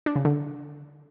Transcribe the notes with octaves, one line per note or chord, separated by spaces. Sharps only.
D4
C#3
D3